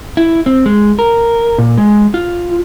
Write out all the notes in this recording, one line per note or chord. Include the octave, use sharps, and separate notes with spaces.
E4
C4
G#3
A#4
A#2
G#3
F4